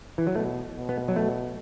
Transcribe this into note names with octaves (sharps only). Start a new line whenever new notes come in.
E3
F#3
B2 A3
B2
B3
F#3
A3